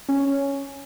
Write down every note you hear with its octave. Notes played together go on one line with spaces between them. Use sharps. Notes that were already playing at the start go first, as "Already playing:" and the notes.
C#4